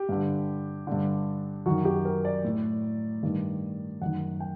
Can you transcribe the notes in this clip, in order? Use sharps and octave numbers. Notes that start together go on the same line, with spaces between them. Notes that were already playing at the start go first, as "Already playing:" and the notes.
Already playing: G4
G2 D3
G2 D3
F#2 D#3 F#4
G4
A#4
D5
A2
G2 D#3
F#2 D#3 F#5
G5